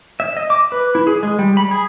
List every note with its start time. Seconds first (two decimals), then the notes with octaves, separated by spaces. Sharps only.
0.20 E5
0.37 D#5
0.50 D6
0.72 B4
0.95 E4
1.07 G#4
1.23 G#3
1.39 G3
1.57 B5
1.71 G#4